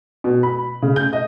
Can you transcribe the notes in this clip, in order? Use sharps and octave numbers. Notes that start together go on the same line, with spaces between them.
B2
B5
C#3
G6
D#5